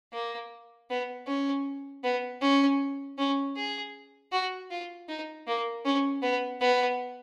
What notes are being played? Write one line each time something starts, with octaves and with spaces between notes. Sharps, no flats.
A#3
B3
C#4
B3
C#4
C#4
G#4
F#4
F4
D#4
A#3
C#4
B3
B3